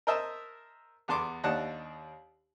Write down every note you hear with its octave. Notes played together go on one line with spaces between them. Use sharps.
A#4 C5 D#5 E5 A5
E2 B3 A5 C6 D6
D#2 D4 D#4 F#5 A5